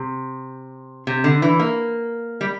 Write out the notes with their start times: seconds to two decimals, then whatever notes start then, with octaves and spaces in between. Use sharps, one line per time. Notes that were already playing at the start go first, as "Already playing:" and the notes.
Already playing: C3
1.07 C3
1.24 D3
1.42 E3
1.59 A#3
2.41 G3